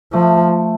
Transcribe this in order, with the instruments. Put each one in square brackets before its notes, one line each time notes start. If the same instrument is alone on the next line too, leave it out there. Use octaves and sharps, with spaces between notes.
[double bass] F3 [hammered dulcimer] A3